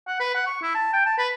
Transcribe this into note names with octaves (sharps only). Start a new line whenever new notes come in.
F#5
B4
F#5
C#6
E4
A5
G5
A5
B4